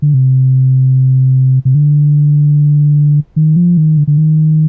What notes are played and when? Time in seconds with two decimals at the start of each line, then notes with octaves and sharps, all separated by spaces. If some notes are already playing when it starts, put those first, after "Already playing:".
0.02 D3
0.14 C3
1.65 C3
1.75 D3
3.36 D#3
3.56 F3
3.77 D#3
3.97 D3
4.07 D3
4.17 D#3